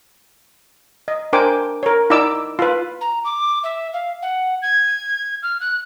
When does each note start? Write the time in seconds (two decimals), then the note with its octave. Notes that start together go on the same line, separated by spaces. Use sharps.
1.08 D#5
1.33 D4 A#4 C5 G5 G#5 D6
1.83 A#4 C#5
2.10 D#4 E4 D5 D#5 D6 E6
2.59 F4 B4
3.01 A#5
3.25 D6
3.64 E5
3.93 F5
4.22 F#5
4.62 G#6
5.43 F6
5.61 F#6